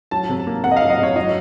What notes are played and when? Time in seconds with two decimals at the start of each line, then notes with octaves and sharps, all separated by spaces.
0.11 F#3 A5
0.29 C3
0.47 A#3
0.64 C3 F#5
0.71 D#5
0.77 F5
0.82 F#3
0.90 D#5
0.98 C3
1.03 C#5
1.16 F#3 D#5